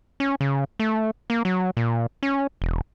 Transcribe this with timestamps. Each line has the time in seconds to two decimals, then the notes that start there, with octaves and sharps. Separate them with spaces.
0.20 C#4
0.41 C#3
0.80 A3
1.30 A#3
1.45 F#3
1.77 A#2
2.23 C#4
2.62 E1